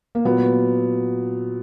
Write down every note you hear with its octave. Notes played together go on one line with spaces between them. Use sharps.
A#3
A#2 F#3 B3